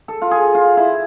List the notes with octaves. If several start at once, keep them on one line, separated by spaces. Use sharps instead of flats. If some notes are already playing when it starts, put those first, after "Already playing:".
A4
F4
G#4
F4
E4